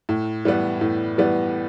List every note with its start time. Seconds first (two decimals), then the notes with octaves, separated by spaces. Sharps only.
0.09 A2
0.45 E3 G3 B3
0.81 A2
1.18 E3 G3 B3